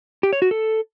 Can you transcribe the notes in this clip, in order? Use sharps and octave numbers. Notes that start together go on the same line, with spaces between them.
G4
C#5
F#4
A4